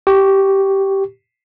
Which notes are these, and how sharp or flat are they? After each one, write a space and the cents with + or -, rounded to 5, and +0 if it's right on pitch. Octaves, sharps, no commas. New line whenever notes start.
G4 -10 C#6 +0